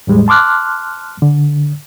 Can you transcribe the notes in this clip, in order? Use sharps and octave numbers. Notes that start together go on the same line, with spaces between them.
E2 A2 G3 G#3
A5 C6 D6 F6 F#6
D3